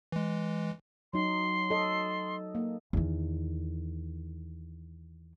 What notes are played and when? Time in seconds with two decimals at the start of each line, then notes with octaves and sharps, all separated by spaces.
0.12 E3 G#3
1.13 F#3 D#4 C6
1.70 A4 D#5
2.55 A#3
2.93 E2 D#3